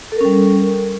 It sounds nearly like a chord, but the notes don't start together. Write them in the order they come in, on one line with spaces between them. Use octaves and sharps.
A4 A#4 C#4 G3